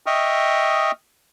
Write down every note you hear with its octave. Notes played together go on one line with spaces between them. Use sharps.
D#5 E5 G5 C#6 D#6 F6